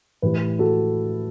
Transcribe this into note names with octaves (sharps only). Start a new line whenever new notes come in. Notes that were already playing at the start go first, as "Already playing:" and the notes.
A2 E3 G4 B4
F#4 A4